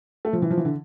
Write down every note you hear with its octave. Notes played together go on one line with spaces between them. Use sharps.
A3
F3
E3
F3
E3
D3